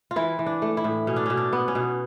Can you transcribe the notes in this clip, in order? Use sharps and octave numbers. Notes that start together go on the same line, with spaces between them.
F4
E3 E4
E3
D4
A3
E4
A2
B2 C#4
D4
B2 C#4
D4
B3
C#4
B2